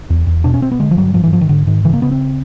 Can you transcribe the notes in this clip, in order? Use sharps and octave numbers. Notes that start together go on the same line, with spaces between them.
E2
E2
B2 D4
C#4
B2 C4
B3
D3 G#3
F3
G2 F#3
G#2 F3
E3
G#2 F3
D#3
G#2 D3
G#2 D#3
C#3 E3
A#3
C#3 B3
C4